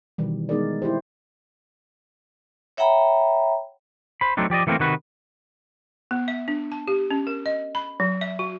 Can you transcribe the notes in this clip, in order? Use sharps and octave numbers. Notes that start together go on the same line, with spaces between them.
B2 D#3 E3 G3
G#3 B3 D#4 G#4 A#4 D5
E4 G4 C5
C#5 E5 F#5 G5 A#5 B5
C5 B5
F#3 A3 C4 D4 D#4
F3 G4 D5 D#5
E3 A3 A#3 C4 A#4
C3 D#3 F#4 B4
B3
E5
D4
A5
G4
C#4
A#4
D#5
B5
F#3
E5
F#4